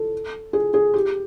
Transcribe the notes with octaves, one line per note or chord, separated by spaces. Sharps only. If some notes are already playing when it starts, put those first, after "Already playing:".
Already playing: A4
G#4
G#4
G4